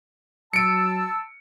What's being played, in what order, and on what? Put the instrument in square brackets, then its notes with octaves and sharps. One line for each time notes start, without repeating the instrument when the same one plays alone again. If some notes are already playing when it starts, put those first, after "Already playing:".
[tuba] F#3 [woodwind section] A5 E6 [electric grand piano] C#7 D7